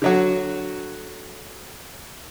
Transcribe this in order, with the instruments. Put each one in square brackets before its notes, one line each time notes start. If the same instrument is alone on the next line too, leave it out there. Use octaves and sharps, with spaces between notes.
[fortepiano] D3 F#3 F#4